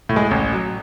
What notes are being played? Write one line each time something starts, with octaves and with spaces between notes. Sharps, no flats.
A2
G#3
A1
F#3